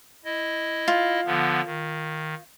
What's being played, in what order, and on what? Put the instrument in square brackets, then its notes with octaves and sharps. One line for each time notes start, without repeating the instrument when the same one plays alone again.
[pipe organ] E4 D#5
[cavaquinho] F4
[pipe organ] D3 F3 B3
D#3